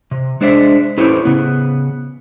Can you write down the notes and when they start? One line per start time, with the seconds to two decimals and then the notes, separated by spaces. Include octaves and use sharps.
0.11 C3
0.41 G#3 D4 C5 D5 E5
0.98 C#4 E4 G4 A4 B4 C5
1.25 C#3 B3